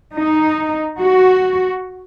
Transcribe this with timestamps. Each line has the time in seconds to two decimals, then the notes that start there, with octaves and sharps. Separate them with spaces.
0.16 D#4
1.01 F#4